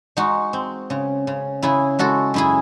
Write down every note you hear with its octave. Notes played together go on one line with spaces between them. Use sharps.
G#3 D#4 F#4
C4
C#3
C#3
C#3 E4 G#4
G#3 F#4 A4
F#2 E4 G#4